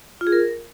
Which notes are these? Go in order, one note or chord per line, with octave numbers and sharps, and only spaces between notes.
F4
G#4
A#4